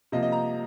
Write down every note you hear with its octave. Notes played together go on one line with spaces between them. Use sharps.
C3 F3 A#3 D#5
D#5
A#5